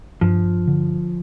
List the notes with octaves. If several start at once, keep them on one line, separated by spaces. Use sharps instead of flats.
G2 F3
D3